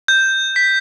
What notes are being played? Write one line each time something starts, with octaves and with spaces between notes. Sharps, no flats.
G6
B6